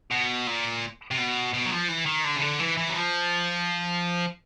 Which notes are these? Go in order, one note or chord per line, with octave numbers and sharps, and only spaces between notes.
B2
A#2
C3
B2
B2
F#3
F3
E3
D#3
D3
C#3
D3
E3
E3
F#3
F3